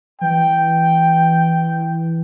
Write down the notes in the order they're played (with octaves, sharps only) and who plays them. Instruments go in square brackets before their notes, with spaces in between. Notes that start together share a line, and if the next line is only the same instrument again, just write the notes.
[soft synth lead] E3 [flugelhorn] G5